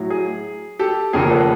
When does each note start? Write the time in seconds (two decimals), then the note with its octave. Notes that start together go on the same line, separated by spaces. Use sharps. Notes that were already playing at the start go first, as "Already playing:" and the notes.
Already playing: A2 F#3
0.10 G#4
0.79 G4 A4
1.13 F1 D#2 C#3 F3 G#4 A#4
1.31 A4 B4